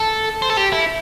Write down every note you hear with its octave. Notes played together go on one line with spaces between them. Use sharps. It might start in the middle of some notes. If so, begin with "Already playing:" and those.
Already playing: A4
C5
A4
G4
E4